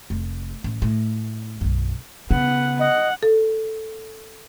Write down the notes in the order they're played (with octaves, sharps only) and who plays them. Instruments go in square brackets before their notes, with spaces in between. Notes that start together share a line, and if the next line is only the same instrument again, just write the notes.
[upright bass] F1
A1
A2
B1 F#2
[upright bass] C#3 [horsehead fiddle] B3 F#5
[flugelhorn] D#5 [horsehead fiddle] F#5
[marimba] A4